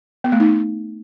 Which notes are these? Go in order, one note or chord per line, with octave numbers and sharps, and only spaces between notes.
B3
A3
D#4